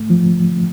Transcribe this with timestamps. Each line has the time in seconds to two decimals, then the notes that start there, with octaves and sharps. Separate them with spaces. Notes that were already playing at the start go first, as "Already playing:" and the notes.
Already playing: G#2 A3
0.10 F3